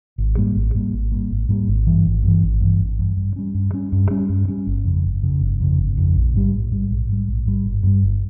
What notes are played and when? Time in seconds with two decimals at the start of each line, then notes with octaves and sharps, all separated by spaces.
0.18 G#1
0.37 G#2 G3 A#3
0.56 G#1
0.75 G#2 G3 A#3
0.93 G#1
1.12 G#2 G3 A#3
1.30 G#1
1.49 G#2 G3 A#3
1.68 G#1
1.87 G2 E3
2.05 G#1
2.23 G2 E3
2.43 G#1
2.61 G2 E3
2.80 G#1
2.99 G2 E3
3.17 G2
3.36 G3 C#4
3.54 G2
3.73 G3 C#4
3.92 G2
4.11 G3 C#4
4.29 G2
4.48 G3 C#4
4.67 G1
4.85 F2 C#3
5.04 G1
5.23 F2 C#3
5.41 G1
5.60 F2 C#3
5.78 G1
5.97 F2 C#3
6.16 A#1
6.34 G#2 G3
6.53 A#1
6.71 G#2 G3
6.90 A#1
7.09 G#2 G3
7.28 A#1
7.46 G#2 G3
7.65 G1
7.83 G2 G3
8.03 G1